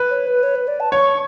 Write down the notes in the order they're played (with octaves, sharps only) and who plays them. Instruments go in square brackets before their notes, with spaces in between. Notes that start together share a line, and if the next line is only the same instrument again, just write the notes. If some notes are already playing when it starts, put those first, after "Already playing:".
Already playing: [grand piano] B4
[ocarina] C#5
B4
C#5
B4
D5
A5
[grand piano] C#5 [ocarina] C#6